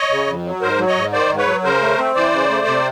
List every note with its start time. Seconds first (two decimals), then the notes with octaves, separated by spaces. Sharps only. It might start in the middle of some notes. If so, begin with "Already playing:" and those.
Already playing: C#5 D#5
0.11 C#3
0.27 F2
0.45 F#3
0.61 G#2 A#4 C5
0.79 F#3
0.87 C#5 D#5
0.96 G#2
1.13 D#3 C5 D5
1.30 G#2
1.38 B4 C#5
1.46 F#3
1.64 C#3 A#4 C5
1.81 A3
1.98 C4
2.15 E3 C5 D5
2.32 C#3
2.50 A3
2.67 C3